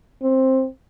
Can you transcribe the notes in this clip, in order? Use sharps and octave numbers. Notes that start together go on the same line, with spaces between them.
C4